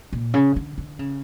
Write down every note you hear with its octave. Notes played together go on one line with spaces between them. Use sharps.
A#2
C#3
D3
D3
C#3